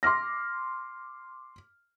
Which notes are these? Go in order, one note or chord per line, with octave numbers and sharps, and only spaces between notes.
C6 D6 F6 A#6